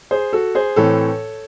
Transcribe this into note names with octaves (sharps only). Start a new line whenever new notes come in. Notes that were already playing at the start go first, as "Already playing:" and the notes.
G#4 C5
F#4 A4
G#4 C5
A2 E3 C4 A4 C#5